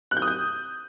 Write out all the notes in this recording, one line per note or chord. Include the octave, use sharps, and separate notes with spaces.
F#6
G6
D#6
G6